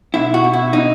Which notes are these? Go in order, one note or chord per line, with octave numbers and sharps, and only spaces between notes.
B2 E4
F#4
B2
E4
B2 D#4